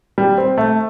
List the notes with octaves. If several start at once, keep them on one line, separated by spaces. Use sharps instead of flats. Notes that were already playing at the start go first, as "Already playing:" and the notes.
G3
C4
A3